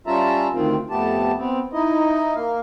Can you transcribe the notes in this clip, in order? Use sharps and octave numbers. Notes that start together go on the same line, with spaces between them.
G3 C#4 F4 E5 A5 A#5
D2 D#3 C4 F4
F2 A3 B3 G4 A5
B3 C4
D#4 E4 D#5
A#3 F5